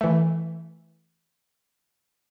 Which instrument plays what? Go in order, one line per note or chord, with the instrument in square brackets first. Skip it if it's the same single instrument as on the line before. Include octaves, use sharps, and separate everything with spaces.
[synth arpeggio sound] E3 A3